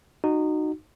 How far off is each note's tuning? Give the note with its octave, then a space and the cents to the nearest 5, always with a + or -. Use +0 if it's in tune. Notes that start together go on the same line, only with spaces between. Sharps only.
D#4 -20 F#4 +0